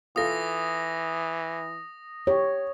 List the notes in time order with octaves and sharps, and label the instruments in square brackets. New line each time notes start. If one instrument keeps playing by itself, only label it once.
[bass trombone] E3 [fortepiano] F4 A4 [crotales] D#6 A#6
[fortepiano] G4 [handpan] C#5